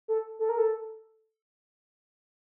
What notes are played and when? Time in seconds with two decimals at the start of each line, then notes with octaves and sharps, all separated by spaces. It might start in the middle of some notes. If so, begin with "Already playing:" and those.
0.08 A4
0.39 A4
0.49 A#4
0.58 A4